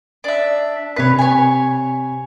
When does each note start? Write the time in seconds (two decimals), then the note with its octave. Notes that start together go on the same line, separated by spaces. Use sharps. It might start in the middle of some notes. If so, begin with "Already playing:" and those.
0.24 D4 E5
0.96 C3 B4 C#5 B6
1.18 C#5 G#5